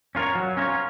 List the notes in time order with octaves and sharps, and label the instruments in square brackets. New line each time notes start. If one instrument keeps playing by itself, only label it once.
[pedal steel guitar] C#4 F4 A#4 C#5
F#3
C#4 F4 A#4 C#5